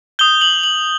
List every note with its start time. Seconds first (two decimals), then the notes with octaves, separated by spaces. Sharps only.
0.19 D#6 G6 G7
0.41 F#7
0.64 F#7